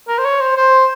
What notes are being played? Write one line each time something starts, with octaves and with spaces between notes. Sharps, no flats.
A#4
C5
C#5
C5
C5